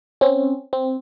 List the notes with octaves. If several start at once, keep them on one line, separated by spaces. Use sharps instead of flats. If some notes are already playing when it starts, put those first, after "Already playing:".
C4 C#4
C4